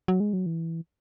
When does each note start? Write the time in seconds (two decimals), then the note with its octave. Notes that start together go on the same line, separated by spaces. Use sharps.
0.08 F#3
0.20 G#3
0.33 F#3
0.46 E3